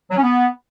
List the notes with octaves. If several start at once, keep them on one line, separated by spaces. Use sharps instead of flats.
F#3
C#4
B3